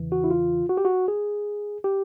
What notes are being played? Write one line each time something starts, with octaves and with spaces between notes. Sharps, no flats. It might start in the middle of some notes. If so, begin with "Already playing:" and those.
Already playing: E2 C#3 E3
F#4
E4
F4
F#4
G4
F#4
G#4
G4